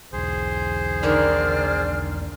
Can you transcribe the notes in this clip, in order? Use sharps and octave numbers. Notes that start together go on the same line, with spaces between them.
B1 E2 G#4 C5
D3 D#3 A#3 D5 F6